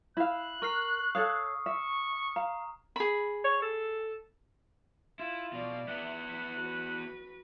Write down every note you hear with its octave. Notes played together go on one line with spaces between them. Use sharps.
E4 F5 F#6
A#4 C#6 F6 C7
A4 C#5 F5 D#6 C7
E5 C#6
F5 A#5
G#4 B5
C#5
A4
E4 F4
B2 D5 F5
B3 E4 E5 F#5
B4
F#4 B4